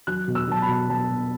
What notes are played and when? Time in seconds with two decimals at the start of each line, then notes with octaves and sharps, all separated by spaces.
0.07 F#3 F#6
0.28 B2
0.35 E6
0.48 F#3 A5
0.62 B5
0.68 B2
0.89 F#3 A5
1.09 B2